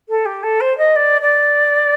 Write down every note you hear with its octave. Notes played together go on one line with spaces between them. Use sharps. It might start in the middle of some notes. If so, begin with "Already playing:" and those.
A4
G4
A4
C5
D#5
D5
D5